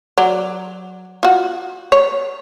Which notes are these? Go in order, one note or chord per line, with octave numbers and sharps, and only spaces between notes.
F#3 D5
F4 F#4
C#5